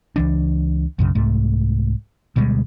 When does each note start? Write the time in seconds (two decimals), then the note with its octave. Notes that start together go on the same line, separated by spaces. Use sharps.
0.16 C#2 E3 D4
0.99 B1 F#2 C#3
1.15 C2 G#2 A3
2.36 D2 B2 G3 G#3